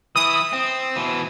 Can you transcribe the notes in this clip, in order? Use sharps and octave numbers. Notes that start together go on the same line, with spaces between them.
E3 E4 D#6
C4
B2 E3